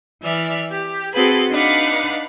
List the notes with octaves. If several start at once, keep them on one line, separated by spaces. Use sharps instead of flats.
E3 D5 E5 F6
G4
C4 F#4 G#4 A4 B4
D4 D#4 B4 F5 F#5